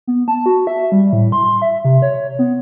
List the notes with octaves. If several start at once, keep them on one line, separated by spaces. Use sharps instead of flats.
B3
A5
F#4
E5
G3
A2
C6
C6
E5
C3
C#5
B3